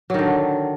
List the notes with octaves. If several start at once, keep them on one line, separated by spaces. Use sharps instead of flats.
D3 D#3 F#3